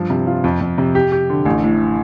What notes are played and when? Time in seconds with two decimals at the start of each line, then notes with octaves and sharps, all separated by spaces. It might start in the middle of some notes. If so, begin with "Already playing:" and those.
Already playing: G2 F3
0.10 C3
0.27 F4
0.44 F2
0.61 F2
0.78 C3
0.95 G4
1.12 G4
1.30 D3
1.45 A1
1.64 A2